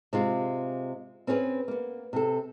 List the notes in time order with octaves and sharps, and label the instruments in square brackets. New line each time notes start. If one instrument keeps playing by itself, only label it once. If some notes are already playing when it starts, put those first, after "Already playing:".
[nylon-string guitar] C3 G#3 F4
C4 C#4 G#4 A#4 B4
A#3 B3
C3 A4